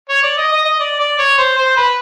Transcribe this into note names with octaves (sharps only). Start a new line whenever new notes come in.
C#5
D5
D#5
D#5
D#5
D5
D5
C#5
C5
C5
B4